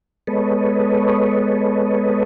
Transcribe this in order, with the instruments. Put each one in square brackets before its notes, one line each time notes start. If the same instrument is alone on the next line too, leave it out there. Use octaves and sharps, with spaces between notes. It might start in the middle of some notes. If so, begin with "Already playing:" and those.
[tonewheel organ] G#3 B3 A4 B4 C#5 D#5